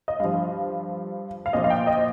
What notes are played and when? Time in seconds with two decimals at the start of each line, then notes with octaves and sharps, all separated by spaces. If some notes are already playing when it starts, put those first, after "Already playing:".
0.08 D#5
0.20 G2 F3 F5
1.46 F5
1.53 A#2 F3 D#5
1.64 F5
1.70 G5
1.87 D#5